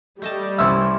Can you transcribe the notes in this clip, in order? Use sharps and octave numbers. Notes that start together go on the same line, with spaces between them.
G3 A3 D#5 A5 G6
C2 C#4 E4 E5 C6 E6 A6